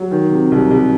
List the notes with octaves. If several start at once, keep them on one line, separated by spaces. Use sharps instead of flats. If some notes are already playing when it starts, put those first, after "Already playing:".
Already playing: F#3
D#3
C3
C2
C2